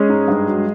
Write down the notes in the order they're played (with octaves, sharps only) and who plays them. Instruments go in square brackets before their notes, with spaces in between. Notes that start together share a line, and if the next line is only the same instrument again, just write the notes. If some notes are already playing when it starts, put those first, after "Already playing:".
Already playing: [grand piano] G#3 C#4 G#4
G#2
G2
F#3